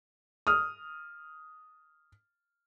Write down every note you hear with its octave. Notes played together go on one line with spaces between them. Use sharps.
D#6 F6